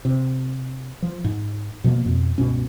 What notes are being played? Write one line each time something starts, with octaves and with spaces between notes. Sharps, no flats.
C3
F3
G#2
B2 F3 G#3 A#3
F2 B2
C#2 G2 B2 C#4